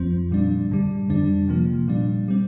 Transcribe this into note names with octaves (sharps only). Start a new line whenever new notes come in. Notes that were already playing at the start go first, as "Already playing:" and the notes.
Already playing: F2 F3 C4
A#2 G3 D4
G2 D3 G3
F2 D3 G3 D4
C3 F3 A#3
A#2 G3 D4
G3 C4